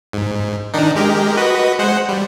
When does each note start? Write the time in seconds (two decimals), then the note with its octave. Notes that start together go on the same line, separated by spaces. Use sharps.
0.13 G#2
0.74 D#3 D4 D#4
0.96 G#3 G4 A#4
1.37 F#4 B4 D#5
1.79 G#3 C5 F#5
2.09 G3